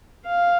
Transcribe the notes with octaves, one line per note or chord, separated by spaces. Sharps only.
F5